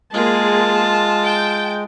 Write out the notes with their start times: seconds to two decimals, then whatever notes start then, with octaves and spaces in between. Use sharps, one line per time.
0.14 G#3 A#3 F4 G#4 A5
1.24 G5